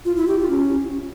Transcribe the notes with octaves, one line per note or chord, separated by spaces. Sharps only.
F4
E4
G4
F4
C#4